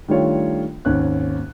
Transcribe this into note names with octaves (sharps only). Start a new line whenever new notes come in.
D#3 G3 A3 D4 F4 C#5
G#1 D#2 C#4 F#6